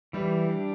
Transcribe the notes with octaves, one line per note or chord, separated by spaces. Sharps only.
E3 G3
D4